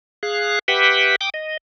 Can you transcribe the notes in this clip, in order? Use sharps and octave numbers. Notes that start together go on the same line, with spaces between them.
G#4 F5 F#6
G4 B4 E5 F#5 G5
G5 D6 D#6
D#5